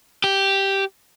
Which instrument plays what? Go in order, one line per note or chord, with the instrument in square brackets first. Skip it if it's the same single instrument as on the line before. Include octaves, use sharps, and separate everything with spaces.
[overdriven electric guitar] G4